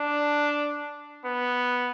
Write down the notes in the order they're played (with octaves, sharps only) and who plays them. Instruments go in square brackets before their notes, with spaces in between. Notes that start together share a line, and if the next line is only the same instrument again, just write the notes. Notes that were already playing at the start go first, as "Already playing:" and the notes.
Already playing: [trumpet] D4
B3